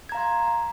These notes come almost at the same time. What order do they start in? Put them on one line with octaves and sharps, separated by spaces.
G#6 A#5 F5 C6